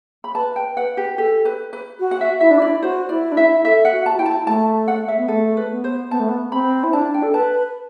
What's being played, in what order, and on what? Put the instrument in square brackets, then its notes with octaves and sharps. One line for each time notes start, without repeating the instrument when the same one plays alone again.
[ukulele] B5
[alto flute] B4 [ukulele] A5
[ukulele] G5
[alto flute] B4 [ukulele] F#5
[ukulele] G4
[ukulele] G4 [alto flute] A4
[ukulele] B4
B4
[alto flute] F#4
[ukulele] F#5
E5
[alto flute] E4 [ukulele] E5
[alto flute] D4
[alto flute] E4 [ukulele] D5
[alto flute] F#4 [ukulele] C5
[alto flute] E4 [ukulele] D5
[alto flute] D4
[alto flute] E4 [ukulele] E5
[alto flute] A4 [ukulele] E5
[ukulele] F#5
[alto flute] F#4
[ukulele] A5
[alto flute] F#4
[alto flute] E4 [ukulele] G5
[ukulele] A5
[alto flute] A3 [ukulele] A5
[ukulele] F#5
E5
[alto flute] B3
[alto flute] A3 [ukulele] A4
[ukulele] B4
[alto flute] B3
[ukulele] C5
[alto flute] B3 [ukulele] A5
[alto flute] A3
B3
[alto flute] C4 [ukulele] B5
[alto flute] E4
[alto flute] D4 [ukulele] A5
[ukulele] G5
[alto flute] A4
[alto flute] B4 [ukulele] A5